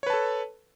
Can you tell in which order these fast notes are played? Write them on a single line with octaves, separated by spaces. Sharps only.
C#5 B4 A5 A4